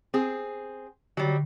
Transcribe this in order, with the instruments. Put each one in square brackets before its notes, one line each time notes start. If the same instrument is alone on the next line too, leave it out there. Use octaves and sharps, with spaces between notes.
[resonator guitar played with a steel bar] C4 G#4
[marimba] D3 [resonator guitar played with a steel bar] F#3 G3